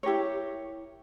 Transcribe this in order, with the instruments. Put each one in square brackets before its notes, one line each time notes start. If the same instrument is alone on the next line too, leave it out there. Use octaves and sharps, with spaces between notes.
[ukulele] E4 G4 A#4 C#5